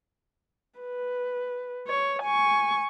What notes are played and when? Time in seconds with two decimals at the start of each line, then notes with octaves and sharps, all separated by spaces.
0.80 B4
1.87 C#5
2.23 G#5 C#6